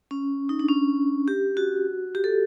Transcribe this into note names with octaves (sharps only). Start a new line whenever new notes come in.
C#4
D#4
D4
C#4
G4
F#4
G4
A4